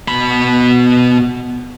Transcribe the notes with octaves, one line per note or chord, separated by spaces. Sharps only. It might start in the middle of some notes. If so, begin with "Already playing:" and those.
B2 B5